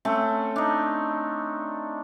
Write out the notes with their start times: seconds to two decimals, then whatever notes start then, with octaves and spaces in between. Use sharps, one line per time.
0.05 A3 C4 C#4
0.56 D4 D#4